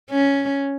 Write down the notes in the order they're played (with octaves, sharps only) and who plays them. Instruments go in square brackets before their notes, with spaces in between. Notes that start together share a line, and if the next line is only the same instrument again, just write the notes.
[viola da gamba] C#4